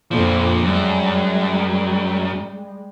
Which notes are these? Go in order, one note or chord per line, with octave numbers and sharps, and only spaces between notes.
F2 A#2 F3
F#2 G3 G#3